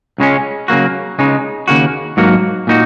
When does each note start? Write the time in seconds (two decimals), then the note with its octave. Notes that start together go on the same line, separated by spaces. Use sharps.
0.18 C#2 C#3 G#3 C#4
0.68 C#3 F#3 A#3 F#4
1.19 C#2 C#3 G#3 D#4
1.68 D#2 C#3 A#3 F#4
2.17 G#2 F#3 A#3 F#4
2.67 A#2 A#3 D#4 F#4